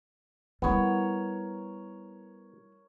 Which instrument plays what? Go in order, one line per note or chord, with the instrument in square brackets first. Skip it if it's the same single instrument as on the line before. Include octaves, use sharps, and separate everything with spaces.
[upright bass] G3 E4 [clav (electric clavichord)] B3 [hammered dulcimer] A#4 C#5